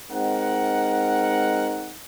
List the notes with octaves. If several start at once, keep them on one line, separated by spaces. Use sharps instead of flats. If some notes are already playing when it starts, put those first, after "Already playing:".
G#3 C4 D#4 A#4 F#5